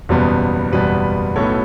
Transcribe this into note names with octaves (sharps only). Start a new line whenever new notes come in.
F#1 E2 B2 G3 B3
F#1 E2 B2 G3 B3 B4
B1 A2 F#3 B3 A4 C#5